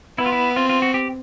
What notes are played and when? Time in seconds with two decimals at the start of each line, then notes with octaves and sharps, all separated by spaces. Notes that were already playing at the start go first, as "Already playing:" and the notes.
0.18 B3 E4
0.26 F4
0.32 E4
0.56 C4 F4
0.69 F4
0.82 F#4
0.94 G4